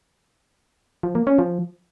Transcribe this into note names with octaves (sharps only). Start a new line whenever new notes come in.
F3
A#3
C#4
F3